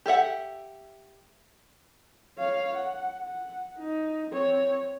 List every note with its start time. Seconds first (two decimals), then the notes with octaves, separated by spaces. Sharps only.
0.06 G4 A4 E5 F#5
2.38 C#5 F5
2.75 F#5
3.20 F#5
3.78 D#4
4.30 C4 C#5